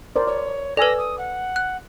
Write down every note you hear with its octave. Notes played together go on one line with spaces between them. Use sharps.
A#4 C5 D5
C#5 D5
A4 B4 D5 G#5 E6 A#6
D#6
F#5
F#6